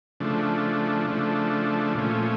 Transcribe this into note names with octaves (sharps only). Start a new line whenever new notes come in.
C#3 F3 A3 D4
C#3 F3 A3 D4
A#2 F3 A3 C#4